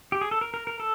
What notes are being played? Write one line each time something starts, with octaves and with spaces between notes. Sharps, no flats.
G4
G#4
A4
A#4
A#4
A#4
A4